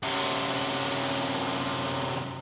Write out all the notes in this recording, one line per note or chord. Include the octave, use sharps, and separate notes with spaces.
F#2 C3